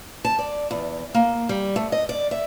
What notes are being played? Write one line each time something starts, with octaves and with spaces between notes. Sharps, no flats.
A5
D5
E2
A#3
G3
A3
D#5
D5
E5